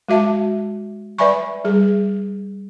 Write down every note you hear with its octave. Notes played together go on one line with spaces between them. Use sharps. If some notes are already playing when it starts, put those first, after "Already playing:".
G#3 F#4 E5 A5
B4 D5 E5 G#5 B5 C#6
G3 G#4